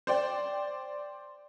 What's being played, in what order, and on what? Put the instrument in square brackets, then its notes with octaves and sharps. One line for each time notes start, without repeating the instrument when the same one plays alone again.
[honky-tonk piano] C5 D5 G5